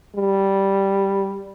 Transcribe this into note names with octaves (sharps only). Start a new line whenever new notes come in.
G3